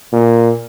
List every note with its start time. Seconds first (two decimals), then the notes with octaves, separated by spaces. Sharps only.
0.13 A#2